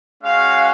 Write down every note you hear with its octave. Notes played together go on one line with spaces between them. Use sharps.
G#3 C#4 F#4 F5